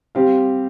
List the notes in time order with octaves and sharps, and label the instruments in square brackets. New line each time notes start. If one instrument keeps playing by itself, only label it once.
[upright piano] G3 C4 G4 F5